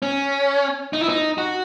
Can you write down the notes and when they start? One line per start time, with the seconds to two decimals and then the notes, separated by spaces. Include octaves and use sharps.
0.02 C#4
0.93 D#4
1.01 E4
1.09 D#4
1.38 F#4